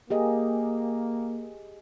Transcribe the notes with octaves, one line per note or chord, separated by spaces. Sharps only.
A#3 G4 G#4 D#5